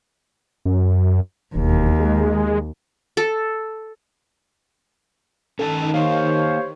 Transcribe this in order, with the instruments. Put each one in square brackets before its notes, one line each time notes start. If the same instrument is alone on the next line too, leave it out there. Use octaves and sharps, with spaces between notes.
[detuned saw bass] F#2
[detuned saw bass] E1 [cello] D#2
[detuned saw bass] G#3
[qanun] A4
[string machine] D#3 [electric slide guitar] C#4 G4 A5 [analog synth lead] A4
[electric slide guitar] A#3 D#4 [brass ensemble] G4 C5 C#5 [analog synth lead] F5